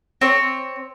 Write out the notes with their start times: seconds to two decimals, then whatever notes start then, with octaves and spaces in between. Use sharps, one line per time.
0.21 C4 C#5